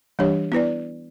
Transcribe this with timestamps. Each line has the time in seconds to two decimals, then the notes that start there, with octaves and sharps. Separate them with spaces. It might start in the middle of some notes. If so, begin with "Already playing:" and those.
0.19 E3 G3 D4 G4 C#5
0.52 B3 E4 B4 D5